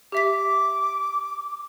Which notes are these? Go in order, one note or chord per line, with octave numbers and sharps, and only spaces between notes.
G4 E5 D6 B6